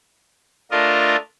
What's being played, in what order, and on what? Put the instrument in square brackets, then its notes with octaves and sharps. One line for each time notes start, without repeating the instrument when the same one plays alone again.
[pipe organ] A3 D4 F4 A#4 D#5